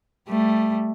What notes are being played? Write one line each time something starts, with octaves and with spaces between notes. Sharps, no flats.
G3 A3